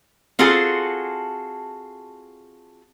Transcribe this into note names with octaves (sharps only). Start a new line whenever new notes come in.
C4 F4 F#4 G#4 A4